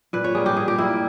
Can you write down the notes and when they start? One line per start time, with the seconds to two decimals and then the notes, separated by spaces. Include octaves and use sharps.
0.13 A#2 B4
0.24 C#5
0.35 G3 A#3 G#4
0.46 G4
0.57 A#2 G#4
0.68 G4
0.78 G3 A#3 E4